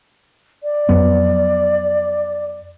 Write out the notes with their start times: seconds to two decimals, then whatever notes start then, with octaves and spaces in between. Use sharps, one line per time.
0.63 D5
0.89 F2 F#3 B3